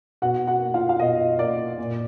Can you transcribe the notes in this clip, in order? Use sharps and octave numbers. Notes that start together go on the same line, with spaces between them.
B2 F#4 F#5
F#4 F#5
A#3
F4 F5
F5
B2 D#5
A#3 D5
A#2